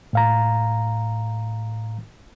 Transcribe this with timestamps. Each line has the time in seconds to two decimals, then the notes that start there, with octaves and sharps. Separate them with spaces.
0.13 A2 F5 A#5